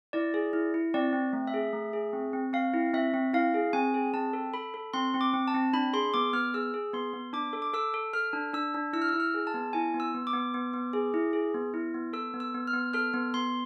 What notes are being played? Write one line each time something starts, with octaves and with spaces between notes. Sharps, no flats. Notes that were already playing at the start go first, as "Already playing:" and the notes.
E4 D5
G#4
E4
E4
C4 D5
C4
A3
E5
G#4
A3
G#4
C4
C4
C4 F5
E4
C4 E5
C4
E4 F5
G#4
C4 G#5
G#4
C4 A5
A4
A4 B5
A4
C4 C6
C4
D6
C4
A5
C4
D4 B5
G#4 C6
B3 D6
B3 F6
G#4 E6
G#4
B3 C6
B3
D4 D6
A4
D6
A4 E6
A4
A4 F6
D4
D4 E6
D4
E4 E6
F6
E6
E4
F6
G#4
A5
B3
E4 G#5
B3
E6
B3
D6
B3
B3
B3
G#4
E4
G#4
B3
E4
B3
A4 E6
B3
E6
B3
F6
B3
A4 F6
B3
B3 C6